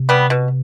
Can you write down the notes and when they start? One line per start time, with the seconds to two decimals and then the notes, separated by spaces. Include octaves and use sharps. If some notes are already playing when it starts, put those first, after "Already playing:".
Already playing: C3
0.09 G3 B3
0.30 B2